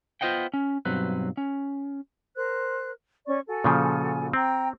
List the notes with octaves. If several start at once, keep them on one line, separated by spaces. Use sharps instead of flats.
B3 F4 C5 D#5 F#5 G5
C#4
B1 G2 F#3 C4 B4
C#4
A#4 C5 F#6
C#4 D5 C#6
F#4 A4 G#5
A#2 C#3 F3
C4 G5 A#5